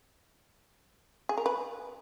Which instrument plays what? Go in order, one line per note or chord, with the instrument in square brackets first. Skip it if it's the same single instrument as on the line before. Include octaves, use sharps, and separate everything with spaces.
[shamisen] G#4
A#4
B4